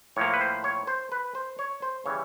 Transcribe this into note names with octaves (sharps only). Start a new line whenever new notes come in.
A2 F3 A#3 C#5
B4
C5
C#5
C5
B4
C5
C#5
C5
C#3 E3 G3 C#5